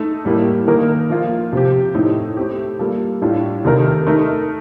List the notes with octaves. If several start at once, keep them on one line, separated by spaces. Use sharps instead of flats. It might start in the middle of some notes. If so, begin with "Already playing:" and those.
Already playing: A3 D#4 A4
A2 G3 A#3
D#3 A#3 D#4 A#4
F3 A#3 F4
C3 F3 C4 G4
A2 A3 C4 D#4
A3 C4 G4
G3 A#3 F4 A4
A2 G3 D4 F4
C3 D#3 A3 D#4 A#4
A3 D#4 A#4